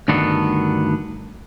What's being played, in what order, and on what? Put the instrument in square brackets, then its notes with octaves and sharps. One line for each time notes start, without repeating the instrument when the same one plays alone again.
[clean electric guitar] D2 G2 D#3 B3 D4 A4